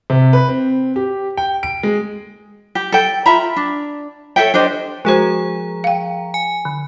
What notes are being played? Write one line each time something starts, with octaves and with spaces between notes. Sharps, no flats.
C3
B4
C4
G4
G5
D7
G#3
G4
A4 G5
F4 E5 A#5 B5
D4
A4 C#5 E5 G5
D4 G4 C5 D#5
F3 G#3 F#4 G#4 C5 A#5
F5 G5
G#5
D3